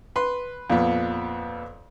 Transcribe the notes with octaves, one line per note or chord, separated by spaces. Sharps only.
B4 C6
F2 A#2 F3 B3